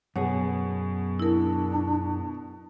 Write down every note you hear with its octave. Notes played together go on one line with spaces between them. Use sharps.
F#2 B2 G#4 C#5 F#5
D4 E4 A#4